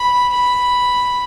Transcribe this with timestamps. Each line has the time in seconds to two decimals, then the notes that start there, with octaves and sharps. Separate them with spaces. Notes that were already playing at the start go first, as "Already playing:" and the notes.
Already playing: B5
0.34 B5